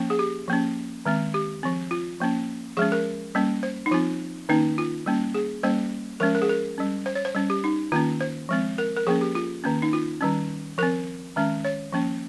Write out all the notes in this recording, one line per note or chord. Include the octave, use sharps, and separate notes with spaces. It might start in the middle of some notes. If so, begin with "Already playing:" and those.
Already playing: F3 A#3 C#4
G#4
G4
F3 A#3 C#4
D#3 G#3 C4
G4
F3 C4
F4
F3 A#3 C#4
F3 G#3 C#4 G#4
A#4
G3 A#3 C#4
C5
D#4
F3 C4 F4
D#3 A#3 C#4 D#4
F4
G3 A#3 C#4
G#4
G3 A#3 C#4 C5
F3 G#3 C#4 A#4
A#4
G#4
A#4
G3 C#4
C5
C#5
C5
G3 C#4
G4
D#4
D#3 A#3 C#4 F4
C5
F3 G#3 C4
A#4
A#4
F3 A#3 C#4 G#4
G4
F4
D#3 A#3 C#4
D#4
F4
D#3 G3 C#4
F3 C4 A#4
D#3 G#3 C#4
C#5
F3 A#3 C#4